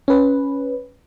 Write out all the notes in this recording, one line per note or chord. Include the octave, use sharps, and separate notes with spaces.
C#4 B4